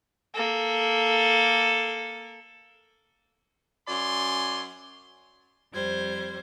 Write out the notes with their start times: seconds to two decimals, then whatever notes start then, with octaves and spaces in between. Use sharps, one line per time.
0.34 A#3 A4
3.87 F#2 D5 G#5 C6
5.73 F2 G3 C5 G#6